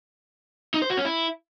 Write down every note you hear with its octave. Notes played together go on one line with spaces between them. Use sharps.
D#4
C5
F#4
C#4
E4